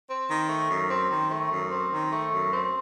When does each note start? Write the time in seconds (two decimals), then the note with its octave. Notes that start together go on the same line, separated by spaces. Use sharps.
0.08 C4
0.28 D#3
0.48 A3
0.69 F#2
0.90 C4
1.10 D#3
1.29 A3
1.50 F#2
1.71 C4
1.91 D#3
2.11 A3
2.31 F#2
2.52 C4